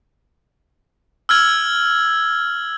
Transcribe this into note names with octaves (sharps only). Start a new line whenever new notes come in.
E6 F6 G#6 F#7